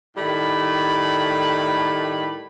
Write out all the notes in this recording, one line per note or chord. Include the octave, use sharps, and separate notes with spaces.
A2 D#3 G3 A3 B5